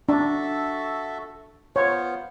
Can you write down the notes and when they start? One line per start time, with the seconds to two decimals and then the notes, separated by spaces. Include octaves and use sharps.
0.09 D4 F#4 A4 E5
1.76 B3 F4 C5 C#5